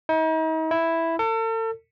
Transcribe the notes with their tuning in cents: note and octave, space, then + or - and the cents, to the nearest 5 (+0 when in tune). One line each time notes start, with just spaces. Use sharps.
D#4 +40
E4 +0
A4 +40